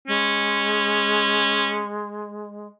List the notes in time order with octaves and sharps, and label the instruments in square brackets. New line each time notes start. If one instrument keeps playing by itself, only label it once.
[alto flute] G#3 [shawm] C#4